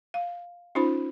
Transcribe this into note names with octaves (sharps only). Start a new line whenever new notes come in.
F5
C#4 D#4 F4 C5 B5